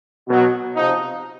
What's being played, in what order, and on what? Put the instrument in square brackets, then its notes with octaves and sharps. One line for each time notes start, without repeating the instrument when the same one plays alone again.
[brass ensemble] B2 F#3
C3 F3 D#4